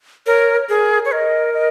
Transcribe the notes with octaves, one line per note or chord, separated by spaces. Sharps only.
A#4 C#5
G#4 A#4
C#5
A#4 D#5
D#5